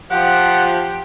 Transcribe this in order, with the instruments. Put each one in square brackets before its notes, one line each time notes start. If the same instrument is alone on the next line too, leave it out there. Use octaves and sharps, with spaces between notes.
[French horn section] F3 [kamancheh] G4 [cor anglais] F#5